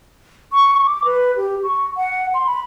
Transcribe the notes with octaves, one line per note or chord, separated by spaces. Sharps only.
C#6
C#6
D6
B4
G4
C#6
F#5
C6
B5